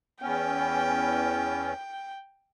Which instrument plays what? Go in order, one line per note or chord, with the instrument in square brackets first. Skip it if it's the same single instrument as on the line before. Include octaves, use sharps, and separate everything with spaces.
[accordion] E2 B3 C#4 [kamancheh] G5